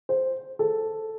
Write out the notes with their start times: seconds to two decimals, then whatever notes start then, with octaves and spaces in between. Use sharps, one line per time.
0.09 C5
0.59 A4